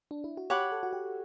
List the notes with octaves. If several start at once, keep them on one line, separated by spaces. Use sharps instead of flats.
D4
E4
F#4
G4 C#5 F#5 B5 D6
A4
F#4
G4